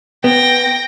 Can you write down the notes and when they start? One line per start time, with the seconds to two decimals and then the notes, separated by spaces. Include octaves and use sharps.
0.24 B3 G5 A#6